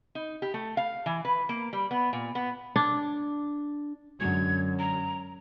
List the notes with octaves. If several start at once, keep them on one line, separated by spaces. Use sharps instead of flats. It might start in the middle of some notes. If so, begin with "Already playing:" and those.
D#4
G4
A3
F5
E3
B4
A#3
G3
B3
A#2
B3
D4
F#2 D3 F#3 G#3 G#6
A#5